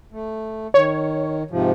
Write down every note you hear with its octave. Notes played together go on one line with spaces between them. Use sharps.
A3
D#3 C#5
G#2 C3 F3